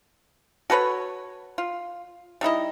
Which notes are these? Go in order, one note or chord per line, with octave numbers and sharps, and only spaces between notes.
F#4 A4 B4 C#5
F4
G3 D#4 E4 D#5